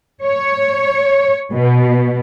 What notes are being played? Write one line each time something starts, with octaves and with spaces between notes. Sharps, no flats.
C#5
B2